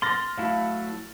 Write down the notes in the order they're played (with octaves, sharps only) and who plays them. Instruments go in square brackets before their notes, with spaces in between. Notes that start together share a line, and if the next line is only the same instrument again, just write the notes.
[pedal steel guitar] C6 [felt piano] F6 A6 A#6
[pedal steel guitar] F#3 A3 E4 [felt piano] F5